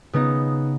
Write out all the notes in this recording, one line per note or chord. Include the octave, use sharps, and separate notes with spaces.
C#3 B3 D#4